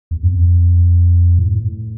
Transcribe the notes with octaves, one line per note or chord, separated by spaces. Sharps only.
E2
G2
F2
A2
G2
A2